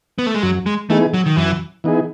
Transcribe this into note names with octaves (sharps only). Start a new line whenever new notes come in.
B3
A3
G#3
F#2 F#3
G#3
E3 A3 B3 D#4 G#4
F#3
D#3
F#2 E3
E3 B3 D#4 G#4